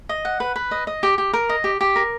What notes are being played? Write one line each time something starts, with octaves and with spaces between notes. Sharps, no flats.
D#5
F#5
B4
B4
D#5
D#5
G4
G4
A#4
D#5
G4
G4
A#4